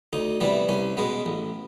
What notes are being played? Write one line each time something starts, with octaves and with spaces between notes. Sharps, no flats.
D2 D#4
C3 E3 G3 B3
C2 C#4
B2 G#3 B3
A1